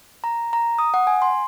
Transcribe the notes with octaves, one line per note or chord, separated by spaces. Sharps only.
A#5
A#5
D#6
F#5
G#5
C6